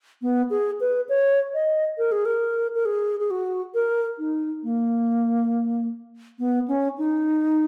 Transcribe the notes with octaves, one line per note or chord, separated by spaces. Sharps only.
B3
G#4
B4
C#5
D#5
A#4
G#4
A#4
A#4
G#4
G#4
F#4
A#4
D#4
A#3
B3
C#4
D#4